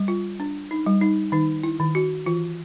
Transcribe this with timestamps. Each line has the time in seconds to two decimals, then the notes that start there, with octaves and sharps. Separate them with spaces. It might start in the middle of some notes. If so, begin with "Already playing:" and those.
Already playing: G3
0.08 F4
0.40 D4
0.71 D#4
0.86 G3
1.01 D#4
1.32 D#3 D#4
1.63 E4
1.80 D#3
1.95 F#4
2.26 E3 F4